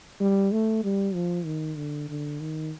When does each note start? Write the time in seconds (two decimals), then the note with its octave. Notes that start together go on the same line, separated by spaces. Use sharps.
0.20 G3
0.52 A3
0.84 G3
1.14 F3
1.45 D#3
1.77 D3
2.09 D3
2.40 D#3